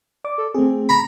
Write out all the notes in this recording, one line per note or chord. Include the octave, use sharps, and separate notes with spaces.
D5 D6
A4
A3 C4 G#4
A#5 B5